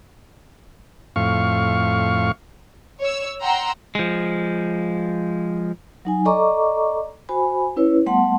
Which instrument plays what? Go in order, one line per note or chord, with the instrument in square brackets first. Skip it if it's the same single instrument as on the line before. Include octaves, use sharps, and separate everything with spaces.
[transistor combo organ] F2 A2 F5 C#6
[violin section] C#5 E6
F#5 G5 A#5 C6 E6
[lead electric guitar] F3 G#3
[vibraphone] F#3 D#4 G#5
A4 D5 D#5 A#5 C#6 D6
F#4 C5 G#5 B5
C#4 E4 B4 C#5
G3 A3 B3 F#5 A5 C6